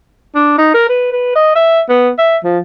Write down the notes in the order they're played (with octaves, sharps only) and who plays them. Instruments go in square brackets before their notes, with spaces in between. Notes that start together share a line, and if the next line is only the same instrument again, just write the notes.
[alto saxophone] D4
D#4
A#4
B4
B4
D#5
E5
B3
E5
F3